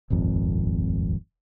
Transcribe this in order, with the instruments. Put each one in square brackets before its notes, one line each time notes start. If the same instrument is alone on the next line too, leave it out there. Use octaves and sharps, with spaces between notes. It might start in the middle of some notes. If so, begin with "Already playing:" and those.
[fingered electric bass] D#1 G#1 F2